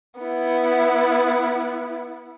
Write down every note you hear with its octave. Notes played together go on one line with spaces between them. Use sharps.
B3 E4